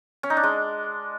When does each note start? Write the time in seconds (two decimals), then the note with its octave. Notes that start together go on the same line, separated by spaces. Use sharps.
0.23 C#4
0.30 D#4
0.37 D4
0.43 G#3